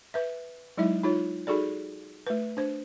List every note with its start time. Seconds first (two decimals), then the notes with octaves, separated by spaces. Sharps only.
0.14 B4 E5
0.77 F#3 G#3 D#4 E4 E5
1.04 D#4 F4 C#5
1.47 D#4 F#4 G#4 A4 D5
2.27 A3 B4
2.57 D4 C5